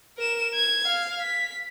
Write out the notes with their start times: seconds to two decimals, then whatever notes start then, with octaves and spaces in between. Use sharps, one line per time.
0.17 A#4 E7
0.54 G#6
0.85 F5
1.21 B6